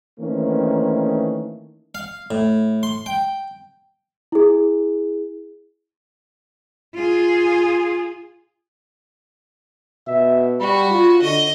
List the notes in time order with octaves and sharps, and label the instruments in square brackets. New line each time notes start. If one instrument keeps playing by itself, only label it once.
[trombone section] D#3 E3 A3 A#3 C4 C#4
[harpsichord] F5
A2
C6
G5
[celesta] E4 G#4
[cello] F4 G#4
[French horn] B2 [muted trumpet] E5
[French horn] G3 [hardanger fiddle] F#4 [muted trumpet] B5
[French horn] F4
[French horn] D3 [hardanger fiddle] D#5